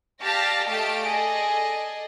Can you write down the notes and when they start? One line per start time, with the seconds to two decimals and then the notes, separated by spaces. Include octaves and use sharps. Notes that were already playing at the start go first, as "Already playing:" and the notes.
0.22 G4 D5 F5 A5 A#6
0.67 A3 G4 D#5 F5 A5 D7
1.05 G#4 A4 D5 D#5